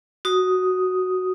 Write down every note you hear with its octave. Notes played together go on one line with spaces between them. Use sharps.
F#4 D#6